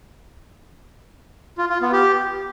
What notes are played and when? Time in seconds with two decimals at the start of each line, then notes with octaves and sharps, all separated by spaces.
1.58 F4
1.69 F4
1.81 B3
1.93 G4